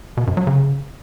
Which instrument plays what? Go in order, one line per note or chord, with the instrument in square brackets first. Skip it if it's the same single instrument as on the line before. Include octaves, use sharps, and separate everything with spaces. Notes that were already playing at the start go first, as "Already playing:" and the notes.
[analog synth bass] B2
F#2
F#3
C#3